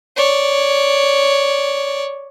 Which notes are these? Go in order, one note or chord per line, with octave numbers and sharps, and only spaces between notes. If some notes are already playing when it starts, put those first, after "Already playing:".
C#5 D5